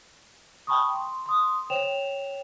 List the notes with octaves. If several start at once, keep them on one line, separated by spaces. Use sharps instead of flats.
G5 A5 B5 C#6 D#6
C6
C6 D#6
C5 C#5 G5 E7 F7